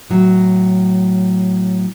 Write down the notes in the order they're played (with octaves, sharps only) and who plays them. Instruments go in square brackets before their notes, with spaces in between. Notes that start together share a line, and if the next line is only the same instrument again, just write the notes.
[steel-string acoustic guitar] A2 F#3